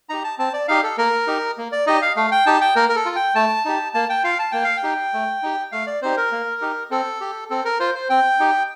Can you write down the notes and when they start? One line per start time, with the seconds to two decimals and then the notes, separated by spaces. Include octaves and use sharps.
0.09 D#4 G4 A#5
0.24 A5
0.38 C4 A5
0.53 D5
0.68 D#4 G4 F5
0.83 A4
0.98 A#3 A#4
1.27 D#4 G4
1.58 A#3
1.72 D5
1.87 D#4 G4 D#5
2.02 F5
2.16 A3 F5
2.31 G5
2.46 D#4 G4 A5
2.61 G5
2.76 A#3 A#4
2.89 A#4
2.96 A4
3.06 F4
3.16 G5
3.35 A3 A5
3.65 D#4 G4
3.94 A#3 A5
4.09 G5
4.24 F4 F5
4.39 A5
4.52 A#3 G5
4.64 F5
4.77 G5
4.83 D#4 G4
5.14 A3
5.43 D#4 G4
5.72 A3 F5
5.87 D5
6.02 C4 D#4 G4 C5
6.17 A#4
6.32 A#3
6.61 D#4 G4
6.91 C4 A4
7.21 G4
7.50 C4 A4
7.65 A#4
7.80 F4 C5
7.95 C5
8.10 C4 G5
8.39 D#4 G4